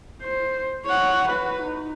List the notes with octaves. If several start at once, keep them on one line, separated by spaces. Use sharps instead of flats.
C5
C#5 F#5
F#4 B4
D#4